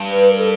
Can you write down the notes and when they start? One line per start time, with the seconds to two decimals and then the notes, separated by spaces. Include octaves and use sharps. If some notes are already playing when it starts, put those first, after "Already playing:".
Already playing: G2
0.09 B4
0.30 A#4
0.39 A4